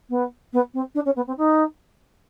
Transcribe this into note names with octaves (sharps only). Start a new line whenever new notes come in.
B3
B3
C4
D4
C#4
B3
C4
D#4